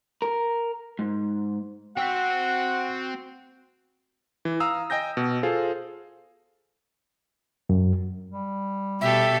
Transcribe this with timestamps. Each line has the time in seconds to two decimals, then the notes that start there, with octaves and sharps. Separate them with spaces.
0.22 A#4
0.99 G#2
1.97 C4 F#4 F#5 G5 E6 B6
4.45 E3
4.60 F5 A#5 D#6 E6
4.90 D#5 G5 G#5 G6 A#6
5.17 B2
5.43 F4 G#4 A4 C5 F5
7.69 F#2
8.31 G3
9.01 B2 G4 A4 E5